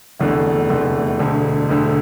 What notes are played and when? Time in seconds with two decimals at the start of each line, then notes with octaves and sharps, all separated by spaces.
0.20 F1 E2 D3 A3
0.69 F1 E2 D3 A3
1.19 E1 D2 D3
1.69 E1 D2 D3